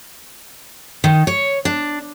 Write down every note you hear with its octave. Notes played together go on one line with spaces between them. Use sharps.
D#3
C#5
D4